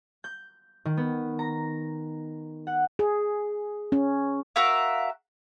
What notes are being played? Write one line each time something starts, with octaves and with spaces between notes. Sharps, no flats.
G6
D#3
B3
A#5
F#5
G#4
C#4
F#4 A#4 E5 F5